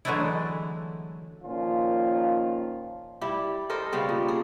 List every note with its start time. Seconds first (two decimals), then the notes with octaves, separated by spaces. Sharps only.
0.05 D3 E3 F#3 G#3 A3 E4
1.44 A#2 D#3 F3 C#4 F4
3.21 G3 E4 G4
3.70 A4 A#4 C5 D#5
3.92 C#3 G3 B3 C4
4.09 A#2
4.28 G#4